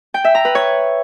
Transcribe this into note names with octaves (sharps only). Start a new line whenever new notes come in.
G5
E5
A#5
B4
C#5